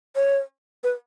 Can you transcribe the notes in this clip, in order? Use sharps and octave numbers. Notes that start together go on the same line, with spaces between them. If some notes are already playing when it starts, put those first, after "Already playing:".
C#5
B4